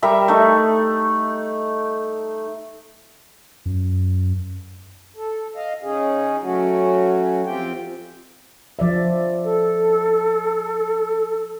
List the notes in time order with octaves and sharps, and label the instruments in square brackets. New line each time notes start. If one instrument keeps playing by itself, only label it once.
[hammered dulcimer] G3 A#4 E5 A#5
A3 D#4
[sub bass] F#2
[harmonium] A4
D#5 F5
C#3 C#4 D#4 G#4
F#3 A3 C#4 F#4
F2 C4 F4 G4 G5
[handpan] F3 D5 E5
[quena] A4